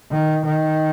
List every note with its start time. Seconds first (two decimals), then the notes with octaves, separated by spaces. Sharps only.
0.11 D#3
0.45 D#3